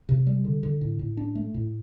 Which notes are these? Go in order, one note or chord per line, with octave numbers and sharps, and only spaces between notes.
C3
G3
D3
D3
A2
A2
D4
A3
A2